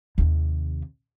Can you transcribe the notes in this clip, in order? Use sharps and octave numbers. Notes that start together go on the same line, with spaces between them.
D#2 C3